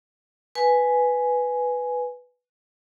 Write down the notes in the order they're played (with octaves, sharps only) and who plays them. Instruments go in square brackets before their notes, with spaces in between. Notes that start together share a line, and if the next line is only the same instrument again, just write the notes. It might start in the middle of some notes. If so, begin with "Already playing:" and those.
[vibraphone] B4 G#5